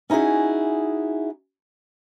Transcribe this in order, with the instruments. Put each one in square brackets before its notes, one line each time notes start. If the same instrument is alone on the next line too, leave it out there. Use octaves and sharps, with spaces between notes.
[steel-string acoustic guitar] C#4 D#4 E4 F#4 G#4